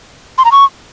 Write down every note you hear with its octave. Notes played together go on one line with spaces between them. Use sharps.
C6
A#5
C#6